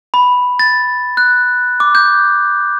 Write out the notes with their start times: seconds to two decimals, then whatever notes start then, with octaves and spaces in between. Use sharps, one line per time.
0.14 B5
0.59 A6
1.17 F#6
1.80 D6
1.95 G6